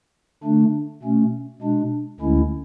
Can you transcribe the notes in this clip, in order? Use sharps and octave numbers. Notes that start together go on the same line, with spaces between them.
D3 A3 D4
B2 A3 C#4
B2 G#3 D4
D2 D3 G#3 C#4 E4